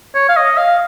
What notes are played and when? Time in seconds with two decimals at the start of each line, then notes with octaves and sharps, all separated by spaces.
0.15 C#5
0.29 F5
0.37 D#5
0.57 F5